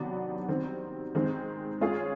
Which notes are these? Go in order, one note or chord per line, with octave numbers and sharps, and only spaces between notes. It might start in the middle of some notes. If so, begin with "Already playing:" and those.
Already playing: C3 D#3 F#3 B3 D4
D#3 G3 C4
D#3 G#3 C4
G#3 C#4 F4 G#4 C#5